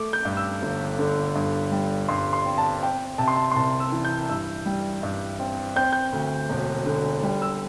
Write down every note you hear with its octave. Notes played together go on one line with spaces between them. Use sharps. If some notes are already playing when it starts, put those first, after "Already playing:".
Already playing: A3 D6
G6
G2
E6
G1
D3
G2
G3
G2 C6
C6
C4
A5
C4 G5
C3 A5
C6
A5
C6
C2 A5
E6
E3
G6
G2 E6
G3
G2
C4
C4 G6
G6
D2
E1
D3
G3
E6